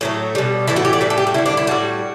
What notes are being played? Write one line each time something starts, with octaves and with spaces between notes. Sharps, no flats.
A2 F#3 A3
B2 G3
A2 E3 A3 E4
F#4
G4
D5
A2 G3 B4
A4
G4
F#4
D3 G3 E4
D4
E4
A2 G3 F#4